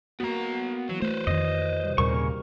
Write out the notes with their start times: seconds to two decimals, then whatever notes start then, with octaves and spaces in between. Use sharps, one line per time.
0.20 A#3 B3 F#4 A#5
0.89 E3 F#3
1.02 A3 B4 C5
1.27 F2 D#3 D#5
1.84 C3 G3
1.98 D#2 A#2 C#3 G3 A#3 A#4 C#6